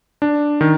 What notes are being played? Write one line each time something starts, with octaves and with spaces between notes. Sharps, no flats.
D4
D#3